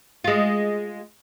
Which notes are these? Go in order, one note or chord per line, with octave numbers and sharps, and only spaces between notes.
G#3 F4